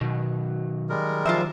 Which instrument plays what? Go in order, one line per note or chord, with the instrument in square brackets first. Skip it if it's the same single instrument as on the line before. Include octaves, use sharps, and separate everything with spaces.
[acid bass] B2 [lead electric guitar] D#3 F#3
[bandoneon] G3 G#3 A#4
[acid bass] F3 [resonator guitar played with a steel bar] F4 C5 E5